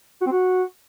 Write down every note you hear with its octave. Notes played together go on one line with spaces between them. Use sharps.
F#4
C4
F#4